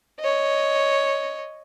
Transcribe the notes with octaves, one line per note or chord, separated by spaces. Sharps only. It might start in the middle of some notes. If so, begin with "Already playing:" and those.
C#5 D#5